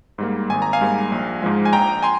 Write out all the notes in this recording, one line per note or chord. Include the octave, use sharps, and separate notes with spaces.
G#2 G3 A#3
G#1 G#5
A#5
F5 G#5
G#2 G3 A#3
A#1
G#2 F3 G#3
G#5
A#1 G5 A#5
G#5 C6